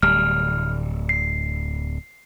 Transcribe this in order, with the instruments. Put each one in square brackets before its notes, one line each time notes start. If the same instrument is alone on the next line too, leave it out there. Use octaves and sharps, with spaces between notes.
[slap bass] D1 G3 [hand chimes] F6
[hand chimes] C7